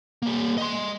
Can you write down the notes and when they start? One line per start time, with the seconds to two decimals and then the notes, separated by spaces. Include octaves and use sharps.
0.22 G3 A#3
0.58 D#5 C6